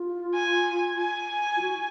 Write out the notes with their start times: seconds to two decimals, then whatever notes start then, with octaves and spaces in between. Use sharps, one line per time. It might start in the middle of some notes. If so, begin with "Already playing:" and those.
Already playing: F4
0.34 G#5
0.98 G#5
1.57 F4
1.61 F#4